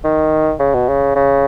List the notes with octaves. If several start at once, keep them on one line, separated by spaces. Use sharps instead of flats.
D#3
C#3
B2
C#3
C#3